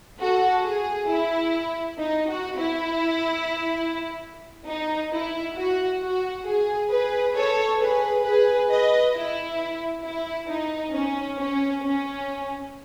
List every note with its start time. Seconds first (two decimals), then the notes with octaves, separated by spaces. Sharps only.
0.19 F#4 A4
0.64 G#4
1.09 E4
1.99 D#4
2.28 F#4
2.58 E4
4.67 D#4
5.11 E4
5.56 F#4
6.00 F#4
6.46 G#4
6.90 G#4 B4
7.35 A4 C#5
7.79 G#4 B4
8.24 G#4 B4
8.69 B4 D#5
9.14 E4
10.03 E4
10.48 D#4
10.93 C#4
11.38 C#4
11.83 C#4